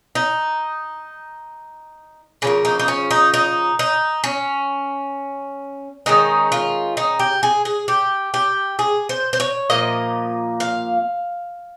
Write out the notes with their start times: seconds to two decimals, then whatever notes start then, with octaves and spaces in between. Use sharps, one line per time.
0.15 D#4
2.42 C#3 F3 A#3 C#4
2.65 D#4
2.79 D#4
2.88 C#4
3.11 D#4
3.34 D#4
3.79 D#4
4.24 C#4
6.06 D#3 G#3 C#4 D#4
6.52 F4
6.97 D#4
7.19 G4
7.43 G#4
7.65 G#4
7.88 G4
8.34 G4
8.79 G#4
9.09 C5
9.33 C5
9.40 C#5
9.70 A#2 F3 A#3 D#5
10.60 F5